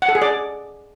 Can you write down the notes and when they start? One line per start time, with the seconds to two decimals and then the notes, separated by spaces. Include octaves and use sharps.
0.02 F#5
0.09 A4
0.15 G#4
0.22 D5